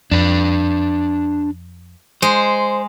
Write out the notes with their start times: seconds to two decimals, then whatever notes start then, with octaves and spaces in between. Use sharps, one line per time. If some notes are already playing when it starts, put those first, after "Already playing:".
0.11 F2 D4 B4
2.22 G#3 C5